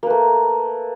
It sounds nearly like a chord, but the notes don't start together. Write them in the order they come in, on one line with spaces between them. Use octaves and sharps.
A#3 B4 A3